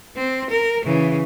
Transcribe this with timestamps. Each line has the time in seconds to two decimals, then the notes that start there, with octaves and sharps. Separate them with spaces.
0.16 C4
0.50 A#4
0.85 C#3 E3